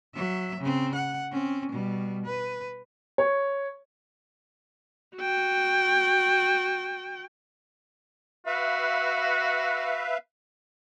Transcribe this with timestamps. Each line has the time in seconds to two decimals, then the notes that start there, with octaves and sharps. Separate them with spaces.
0.15 F#3 E5
0.60 C#3 C4
0.95 F#5
1.32 C4 C#4
1.72 B2 G3
2.26 B4
3.18 C#5
5.17 F#4 G5
8.46 F#4 B4 E5 F5